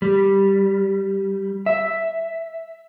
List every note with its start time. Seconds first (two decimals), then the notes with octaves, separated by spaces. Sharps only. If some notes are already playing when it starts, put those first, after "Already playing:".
0.02 G3
1.66 E5